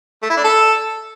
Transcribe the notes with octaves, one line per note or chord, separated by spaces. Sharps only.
A3
E4
D4
A4